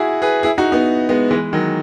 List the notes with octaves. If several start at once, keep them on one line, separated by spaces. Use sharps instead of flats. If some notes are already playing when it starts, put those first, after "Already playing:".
Already playing: E4 F#4 G#4
G#4 B4
E4 G#4
D#4 F#4
B3 D#4
G#3 B3
E3 G#3
D#3 F#3